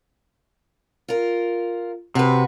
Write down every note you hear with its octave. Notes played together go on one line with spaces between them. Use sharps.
F4 A#4
C3 F#4 B4